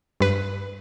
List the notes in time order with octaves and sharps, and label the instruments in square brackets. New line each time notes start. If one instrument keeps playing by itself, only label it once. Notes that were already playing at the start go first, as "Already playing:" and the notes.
[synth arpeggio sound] G2 B4